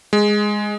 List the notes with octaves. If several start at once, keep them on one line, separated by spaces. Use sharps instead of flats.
G#3